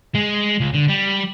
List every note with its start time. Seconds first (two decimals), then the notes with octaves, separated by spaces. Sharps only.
0.15 G#3
0.61 C#2
0.75 D3
0.89 G3